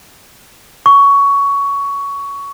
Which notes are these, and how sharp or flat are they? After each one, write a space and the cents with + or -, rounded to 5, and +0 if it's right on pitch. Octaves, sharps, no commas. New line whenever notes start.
C#6 +15